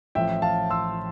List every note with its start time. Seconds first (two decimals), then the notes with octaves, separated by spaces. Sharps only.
0.15 A1 A2 F3 E5 G5
0.42 F5 A5
0.70 C6 E6